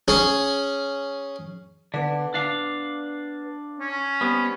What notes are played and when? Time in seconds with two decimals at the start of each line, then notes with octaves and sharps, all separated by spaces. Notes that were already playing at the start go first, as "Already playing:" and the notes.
0.08 C#4 G#4
1.94 D3 B3 D5
2.34 D4 F5
3.80 C#4
4.21 G3 B3 C4 G4